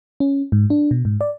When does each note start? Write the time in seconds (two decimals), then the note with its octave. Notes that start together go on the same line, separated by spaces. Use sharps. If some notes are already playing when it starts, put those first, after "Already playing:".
0.20 C#4
0.52 G#2
0.70 D4
0.91 B2
1.05 G#2
1.21 D5